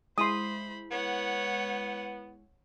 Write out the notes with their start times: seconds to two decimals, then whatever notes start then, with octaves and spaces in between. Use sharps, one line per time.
0.18 G#3 E4 C5 B5 C6 D#6
0.91 B3 C#5 F#5